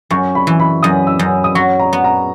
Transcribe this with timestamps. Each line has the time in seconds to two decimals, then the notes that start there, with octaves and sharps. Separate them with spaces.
0.10 F#2 C#6
0.35 B5
0.47 E3
0.60 B5
0.83 F#2 D#6
1.07 E6
1.19 F#2
1.44 D#6
1.55 F#3 C#6
1.80 A#5
1.93 B3
2.04 A#5